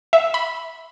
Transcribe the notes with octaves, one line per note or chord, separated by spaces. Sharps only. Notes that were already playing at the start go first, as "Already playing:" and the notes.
E5
B5